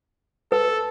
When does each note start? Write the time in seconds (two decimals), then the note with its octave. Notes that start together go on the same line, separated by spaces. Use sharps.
0.52 A4 B4